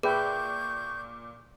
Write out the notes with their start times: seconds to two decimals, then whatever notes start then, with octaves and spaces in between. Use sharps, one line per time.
0.03 A#2 G#4 B4 E5 G5 C#6 G6